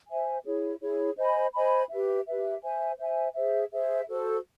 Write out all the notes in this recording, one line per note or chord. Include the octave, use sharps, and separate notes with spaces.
C5 E5 G#5
E4 G#4 C#5
E4 G#4 C#5
C5 D#5 G#5 B5
C5 D#5 G#5 B5
G4 B4 E5
G4 B4 E5
C5 E5 G#5
C5 E5 G#5
G#4 C5 E5
G#4 C5 E5
F#4 A4 C5